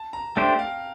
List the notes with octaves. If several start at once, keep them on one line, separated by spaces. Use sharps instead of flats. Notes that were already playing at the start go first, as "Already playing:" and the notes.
Already playing: A5
A#5
A3 D4 G4 C5 G5
F5